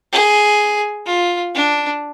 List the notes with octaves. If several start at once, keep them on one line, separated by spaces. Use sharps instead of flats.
G#4
F4
D4